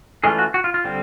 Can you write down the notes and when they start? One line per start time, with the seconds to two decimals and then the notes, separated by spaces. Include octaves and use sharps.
0.24 E3 G#3 A3 C#4 F4 G#4
0.39 F#4
0.54 F#4
0.64 F4
0.74 F4
0.84 D3 G3 C4